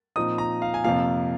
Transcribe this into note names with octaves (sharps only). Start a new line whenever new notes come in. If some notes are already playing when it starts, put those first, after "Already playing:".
A#2 F3 C4 D#4 D#6
A#5
F5
G#5
F2 C3 F3 A#3 F5